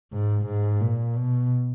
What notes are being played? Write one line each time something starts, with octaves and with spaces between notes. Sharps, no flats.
G#2
G#2
A#2
B2